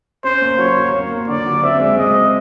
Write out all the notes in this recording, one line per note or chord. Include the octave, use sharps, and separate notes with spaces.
C#4 C5
A#3
F#3 C#5
F#3
A#3
A#3
D3 D5
F#3
C4 E5
G#3
G#3 D#5
C4